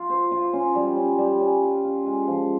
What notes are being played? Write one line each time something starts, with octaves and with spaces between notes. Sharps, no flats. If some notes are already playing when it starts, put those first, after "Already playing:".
Already playing: F4
C5
F4
C#4
G3
C#4
G3
C#4
F4
F4
G#3
F3